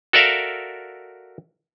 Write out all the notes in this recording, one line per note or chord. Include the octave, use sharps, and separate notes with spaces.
F#4 A4 A#4 D5 E5 F5